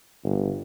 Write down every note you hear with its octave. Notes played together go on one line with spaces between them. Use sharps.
G1